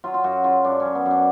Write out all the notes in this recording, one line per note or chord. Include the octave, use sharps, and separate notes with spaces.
F#3 F4
F4
F#2 F#4
C#3 F4
F#2 D4
C#4
F#3
B3
F#2
D4